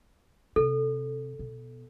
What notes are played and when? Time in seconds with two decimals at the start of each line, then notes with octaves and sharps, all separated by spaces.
0.56 C3 A4
1.39 B2